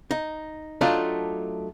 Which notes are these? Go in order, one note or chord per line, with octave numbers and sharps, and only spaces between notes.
D#4
F#3 A3 D4 D#4 F4